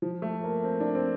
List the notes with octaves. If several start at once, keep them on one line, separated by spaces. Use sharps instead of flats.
F3
A3
A#3
C4
D4
C4